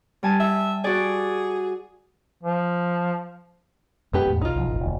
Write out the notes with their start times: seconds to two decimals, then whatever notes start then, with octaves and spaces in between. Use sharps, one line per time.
0.23 G3 G#5 A5
0.40 E5
0.84 F#4 G#4 D5
2.43 F3
4.13 F#2 G#3 B3 D4 G4 B4
4.27 E2 A2
4.42 B1 D#4 F4
4.56 C2 F3
4.67 E1 A1
4.80 E1 D2